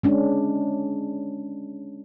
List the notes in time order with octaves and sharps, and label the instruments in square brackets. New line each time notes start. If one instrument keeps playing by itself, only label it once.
[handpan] G#3 C#4 D4